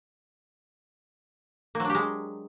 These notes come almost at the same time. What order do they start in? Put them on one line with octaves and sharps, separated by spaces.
A#3 F#3 D4 G4 G#3